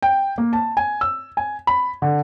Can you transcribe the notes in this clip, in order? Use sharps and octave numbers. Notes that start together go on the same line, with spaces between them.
G5
A#3
A5
G#5
E6
G#5
B5
D3